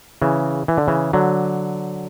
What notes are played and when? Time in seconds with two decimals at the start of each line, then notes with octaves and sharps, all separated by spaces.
0.22 C#3 E3
0.68 E3
0.78 D3
0.88 C#3 E3
1.13 D3 F#3